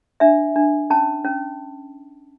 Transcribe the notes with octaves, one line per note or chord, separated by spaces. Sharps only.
D4 E5
D4
C#4 A5
C#4